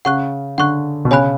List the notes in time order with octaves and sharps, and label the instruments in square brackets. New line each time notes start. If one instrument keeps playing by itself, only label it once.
[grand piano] C#3 [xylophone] F#5 C#6 F#6
[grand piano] D3 [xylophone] F#5 C#6 F#6
[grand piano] B2
[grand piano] C#3 [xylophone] C#5 G#5 B5 F#6